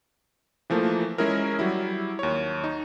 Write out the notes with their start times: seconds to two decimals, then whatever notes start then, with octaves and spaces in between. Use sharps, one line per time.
0.70 E3 F3 A3 A#3
1.18 G#3 C#4 E4 G#4 A#4
1.59 F#3 G3 E4
2.19 D#2 C#5
2.64 D#4